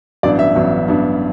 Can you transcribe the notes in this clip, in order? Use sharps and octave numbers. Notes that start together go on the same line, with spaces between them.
A1 G2 F#3 B3 D4 D5
E5
A1 G2 F#3 B3 D4
A1 G2 F#3 B3 D4